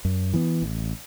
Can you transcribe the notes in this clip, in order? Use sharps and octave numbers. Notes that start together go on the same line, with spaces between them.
F#2
E3 B3
A1